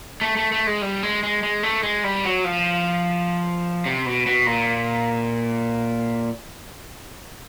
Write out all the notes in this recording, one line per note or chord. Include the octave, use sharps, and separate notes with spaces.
A3
A3
A3
G#3
G3
G#3
G#3
G#3
A3
G#3
G3
F#3
F3
C3
B2
B2
A#2